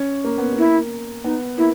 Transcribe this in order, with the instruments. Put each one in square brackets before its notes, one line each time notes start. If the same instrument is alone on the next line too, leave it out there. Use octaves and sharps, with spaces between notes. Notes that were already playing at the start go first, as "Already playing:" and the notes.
Already playing: [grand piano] C#4
A#3
B3
A#3
[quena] E4
[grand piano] B3 [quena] D#4
[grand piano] A#3 [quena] E4